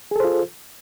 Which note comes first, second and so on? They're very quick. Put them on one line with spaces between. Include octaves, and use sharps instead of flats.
G#4 A4 C5 F4